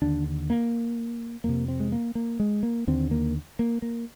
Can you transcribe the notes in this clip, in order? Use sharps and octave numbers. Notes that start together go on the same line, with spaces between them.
D#2 D3 D4
A#3
F2 C3 A#3
C4
G#3
A#3
A#3
G#3
A#3
D#2 D3 C4
A#3
A#3
A#3